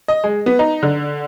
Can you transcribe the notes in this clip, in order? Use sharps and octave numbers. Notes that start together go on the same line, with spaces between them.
D#5
G#3
B3
D#4
D3